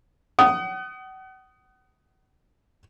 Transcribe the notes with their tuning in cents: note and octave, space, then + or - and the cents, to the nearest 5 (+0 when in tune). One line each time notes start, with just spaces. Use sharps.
F#5 +40 D#6 +0